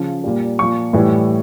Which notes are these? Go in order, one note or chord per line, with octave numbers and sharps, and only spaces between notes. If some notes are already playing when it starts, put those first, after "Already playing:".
Already playing: C#3 F3
A#2 G3
A#2 F3 C#6
A2 E3 G3